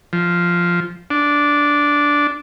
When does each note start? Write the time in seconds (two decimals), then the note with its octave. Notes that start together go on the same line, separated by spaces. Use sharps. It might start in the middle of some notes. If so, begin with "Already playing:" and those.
0.13 F3
1.10 D4